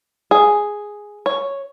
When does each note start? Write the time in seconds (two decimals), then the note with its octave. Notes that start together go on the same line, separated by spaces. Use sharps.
0.31 G#4
1.26 C#5